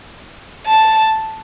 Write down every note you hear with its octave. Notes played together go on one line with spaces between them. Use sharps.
A5